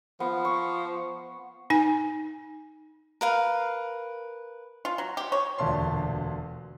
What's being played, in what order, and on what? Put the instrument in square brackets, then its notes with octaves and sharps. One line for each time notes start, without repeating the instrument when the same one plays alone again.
[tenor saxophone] F3 [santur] B3
[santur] C#6
[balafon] D#4 G#5
[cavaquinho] A#4 B4 F5
[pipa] F4
F#3
G4
C#5
[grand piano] E1 D2 A#2 D5 A5 C6